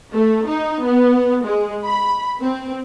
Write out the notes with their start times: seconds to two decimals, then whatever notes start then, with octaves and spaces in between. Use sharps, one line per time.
0.13 A3
0.48 D#4
0.85 B3
1.45 G#3
1.84 B5
2.42 C4